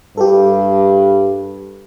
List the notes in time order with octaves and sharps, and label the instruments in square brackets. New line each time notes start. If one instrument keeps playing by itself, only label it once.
[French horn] G2 [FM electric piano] G4 A4